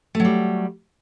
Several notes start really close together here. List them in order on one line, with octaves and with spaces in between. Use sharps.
A3 F#3 G3